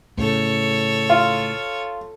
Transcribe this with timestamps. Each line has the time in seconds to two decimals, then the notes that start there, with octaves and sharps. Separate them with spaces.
0.18 A2 C#3 A4 C#5
1.10 F4